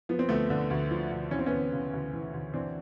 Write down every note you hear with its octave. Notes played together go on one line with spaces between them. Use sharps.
F3 B3
C4
D2 A3 B3
D3
D2
F3
D2
E3 C#4
C4
B3 C#4
D2
C#3
D2
E3
D2
E3 C4 D4